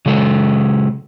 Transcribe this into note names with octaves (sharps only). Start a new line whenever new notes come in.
C#3 F#3 G#3 A4